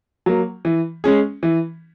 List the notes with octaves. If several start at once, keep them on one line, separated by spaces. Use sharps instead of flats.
F#3 A#3
E3
G#3 C#4 G#4
E3